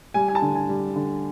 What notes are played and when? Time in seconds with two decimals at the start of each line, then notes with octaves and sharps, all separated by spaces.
0.14 G3 G#5
0.28 G#5
0.35 A5
0.42 D3
0.55 G#5
0.69 G3
0.96 D3